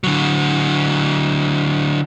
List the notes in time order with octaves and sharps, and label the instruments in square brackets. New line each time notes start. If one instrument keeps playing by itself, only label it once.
[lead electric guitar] D3 F#3